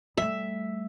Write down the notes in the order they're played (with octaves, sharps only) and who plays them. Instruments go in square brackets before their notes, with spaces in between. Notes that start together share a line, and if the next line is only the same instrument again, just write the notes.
[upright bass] G3 A3 [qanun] E5